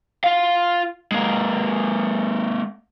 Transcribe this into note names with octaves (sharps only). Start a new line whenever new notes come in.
F4 F5
G#3 A#3